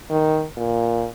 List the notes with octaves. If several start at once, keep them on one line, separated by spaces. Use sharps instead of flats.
D#3
A#2